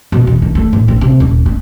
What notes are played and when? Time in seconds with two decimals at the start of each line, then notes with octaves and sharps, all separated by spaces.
0.12 B2
0.27 E2
0.42 D#3
0.55 A3
0.73 A2
0.88 C4
1.01 C3
1.20 D#1
1.46 B3